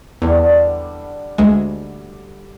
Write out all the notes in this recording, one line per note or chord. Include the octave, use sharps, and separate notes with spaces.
E2 D3 G3 F#5
D2 G#3